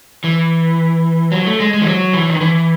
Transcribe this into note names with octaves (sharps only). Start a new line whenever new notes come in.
E3
F#3
A3
G#3
G#3
E3
F#3
E3
D#3
E3